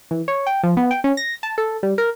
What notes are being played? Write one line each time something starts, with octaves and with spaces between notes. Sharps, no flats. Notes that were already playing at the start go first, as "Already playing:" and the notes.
E3
C#5
G5
F3
B3
G5
C#4
A#6
A5
A4
G3
A#4